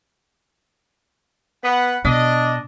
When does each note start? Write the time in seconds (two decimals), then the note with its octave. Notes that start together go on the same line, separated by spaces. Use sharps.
1.64 B3 B4 F#5
2.05 B2 D4 D#5